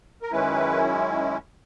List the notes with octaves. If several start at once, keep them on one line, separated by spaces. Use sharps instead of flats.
A#4
F#2 D#3 G#3 C#4 E4 B4